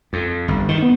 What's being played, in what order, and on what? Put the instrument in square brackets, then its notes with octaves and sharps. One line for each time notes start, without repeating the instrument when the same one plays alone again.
[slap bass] F2
G1
D#3
B3